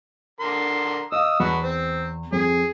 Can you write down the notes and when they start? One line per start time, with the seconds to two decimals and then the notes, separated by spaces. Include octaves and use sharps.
0.40 D3 A#4 C6
1.12 D#5 F5 D#6 E6
1.40 E2 F#3 F#4 B4
1.63 C4
2.32 F2 G#4